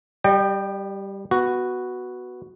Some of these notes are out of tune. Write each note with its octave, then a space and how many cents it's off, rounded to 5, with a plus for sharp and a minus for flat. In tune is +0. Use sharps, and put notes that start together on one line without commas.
G3 +0 D#5 -45 G5 +0
B3 +0 F#4 +0